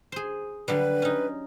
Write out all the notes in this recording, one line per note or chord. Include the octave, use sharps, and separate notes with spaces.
G#4 C5
D3 F#3 G3 B4
C#4 D#4